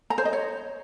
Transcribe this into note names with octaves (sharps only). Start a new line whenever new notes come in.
A#5
C5
D#5
C#5